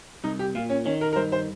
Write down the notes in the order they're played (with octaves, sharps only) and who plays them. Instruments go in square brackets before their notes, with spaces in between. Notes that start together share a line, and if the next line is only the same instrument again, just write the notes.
[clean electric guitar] C2 [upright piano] D#4
[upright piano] G4
[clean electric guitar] A#2 [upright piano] F4
[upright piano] C#4
[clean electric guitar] D#3 [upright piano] C#4
[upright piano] A#4
A#4
[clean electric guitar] G2 [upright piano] C5
[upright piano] C5